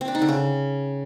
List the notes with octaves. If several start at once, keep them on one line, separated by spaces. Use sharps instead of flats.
C4
D4
D#4
D3
C#3